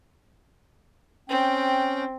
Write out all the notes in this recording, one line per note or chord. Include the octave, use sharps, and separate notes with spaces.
C4 C#4 G5